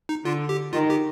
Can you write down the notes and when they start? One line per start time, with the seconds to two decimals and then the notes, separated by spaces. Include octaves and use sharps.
0.09 D#4
0.25 D3 F4
0.49 G4
0.73 D#3 F4
0.90 G4